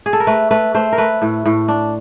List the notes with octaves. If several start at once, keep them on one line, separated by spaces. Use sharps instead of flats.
G#4
A4
A#4
A3 B4
A3 B4
A3 C5
A#4
A3 B4
A2
A2
D4